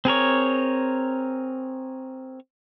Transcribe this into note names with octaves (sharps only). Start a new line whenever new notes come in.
C4 G#4 A#4 C#5